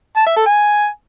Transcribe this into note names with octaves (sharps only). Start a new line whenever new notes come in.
A5
E5
A4
G#5